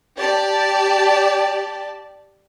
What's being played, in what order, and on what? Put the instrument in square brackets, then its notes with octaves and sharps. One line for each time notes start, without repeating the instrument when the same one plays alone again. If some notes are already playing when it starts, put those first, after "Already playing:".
[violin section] G4 D5 A5